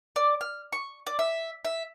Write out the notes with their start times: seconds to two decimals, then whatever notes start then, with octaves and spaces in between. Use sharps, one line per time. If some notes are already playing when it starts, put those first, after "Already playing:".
0.16 D5
0.41 F6
0.72 C#6
1.07 D5
1.19 E5
1.65 E5